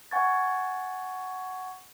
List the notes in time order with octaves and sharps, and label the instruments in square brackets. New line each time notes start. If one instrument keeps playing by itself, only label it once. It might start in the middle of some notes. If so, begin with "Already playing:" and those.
[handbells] F#5 G#5 C#6 G#6 A6